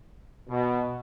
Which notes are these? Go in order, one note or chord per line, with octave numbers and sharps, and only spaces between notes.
B2